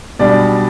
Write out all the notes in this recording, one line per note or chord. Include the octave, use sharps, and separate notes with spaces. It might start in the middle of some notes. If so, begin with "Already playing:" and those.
B1 B2 G3 D4 D5